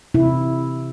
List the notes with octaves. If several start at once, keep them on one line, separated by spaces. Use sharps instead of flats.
C3 E4